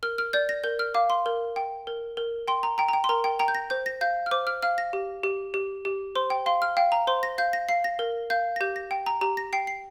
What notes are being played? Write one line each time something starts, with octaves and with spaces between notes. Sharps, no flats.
A#4 F6
F6
D5 G6
A#6
A#4 G6
F6
F5 D6
C6
A#4
G5
A#4
A#4
G5 C6
A#5
G5 A#5
A#5
G5
C6
A#4 A#5
G5
G5 A#5
G6
A#6
C5 G6
A#6
F5 G6
F6
C5 D6
F6
F5 F6
A#6
G4
G4
G4
G4
C5 C6
G5
F5 C6
F6
F5 G5
A#5
C5 C6
A#6
F5 G6
A#6
F5 C7
A#6
A#4
F5 G6
A#6
G4 G6
A#6
G5
A#5
G4 A#5
A#6
G5 C7
C7